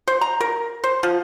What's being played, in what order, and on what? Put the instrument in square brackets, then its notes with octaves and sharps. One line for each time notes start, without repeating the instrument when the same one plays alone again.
[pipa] C5
A#5
A#4
C5
F3